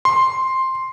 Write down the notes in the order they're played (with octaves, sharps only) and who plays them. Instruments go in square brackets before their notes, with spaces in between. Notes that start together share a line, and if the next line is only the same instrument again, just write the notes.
[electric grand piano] C6